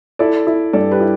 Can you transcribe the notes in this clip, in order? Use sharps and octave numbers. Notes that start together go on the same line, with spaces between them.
E4 A4 D5
E4
G2 A4 D5
G4 B4
E4